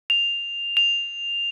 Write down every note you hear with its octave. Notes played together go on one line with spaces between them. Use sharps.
F7
F7